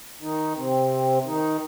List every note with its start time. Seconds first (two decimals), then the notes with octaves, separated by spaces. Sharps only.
0.22 D#3 D#4
0.57 C3 C4
1.26 D#3 D#4